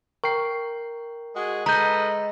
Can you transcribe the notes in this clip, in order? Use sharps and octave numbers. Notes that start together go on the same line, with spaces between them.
A#4 G5 C#6 C7
G#3 F#4 G#4
G#3 A4 B4 D#5 A#5 G6